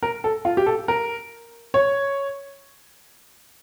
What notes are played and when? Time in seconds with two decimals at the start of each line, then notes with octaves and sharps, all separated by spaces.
0.03 A#4
0.24 A4
0.45 F4
0.57 G4
0.66 A4
0.88 A#4
1.74 C#5